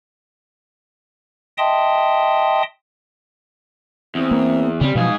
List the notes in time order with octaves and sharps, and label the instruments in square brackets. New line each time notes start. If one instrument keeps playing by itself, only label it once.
[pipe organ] D#5 E5 G5 A5 C6 D#6
[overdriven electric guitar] E2 [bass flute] C4
[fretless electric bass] A#3
[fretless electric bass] C#3 C4 [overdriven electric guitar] G3
[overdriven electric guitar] G#2 G#4 [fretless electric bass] B2 F3 F#3 [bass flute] F5